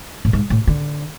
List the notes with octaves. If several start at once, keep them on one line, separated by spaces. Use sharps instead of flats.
A2
G#2
A2
D3